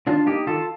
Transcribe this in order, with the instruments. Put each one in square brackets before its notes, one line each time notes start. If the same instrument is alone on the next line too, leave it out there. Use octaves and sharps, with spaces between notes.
[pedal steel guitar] D#3 D4 F4
A#3 D#4 G4
D#3 F4 A4